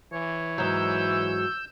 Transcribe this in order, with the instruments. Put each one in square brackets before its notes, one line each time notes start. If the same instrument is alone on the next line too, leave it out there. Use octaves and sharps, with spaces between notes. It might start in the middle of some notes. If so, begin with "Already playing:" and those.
[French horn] E3 [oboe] C#5
[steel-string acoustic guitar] G#2 F#3 [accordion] E6 G6